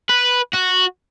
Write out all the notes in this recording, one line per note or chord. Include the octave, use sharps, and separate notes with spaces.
B4
F#4